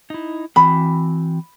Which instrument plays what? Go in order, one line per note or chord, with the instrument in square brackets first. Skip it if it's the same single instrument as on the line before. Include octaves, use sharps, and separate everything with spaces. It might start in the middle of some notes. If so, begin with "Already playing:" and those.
[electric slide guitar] D#4 E4
[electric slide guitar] E3 C4 F#4 [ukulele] B5